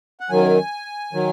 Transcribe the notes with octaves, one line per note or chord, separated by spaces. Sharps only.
F#5
F#2 D#3 F#3 G#5
D#3 F#3